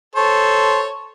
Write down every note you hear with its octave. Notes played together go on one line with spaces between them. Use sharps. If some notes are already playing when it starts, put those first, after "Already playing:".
A4 C5 C#5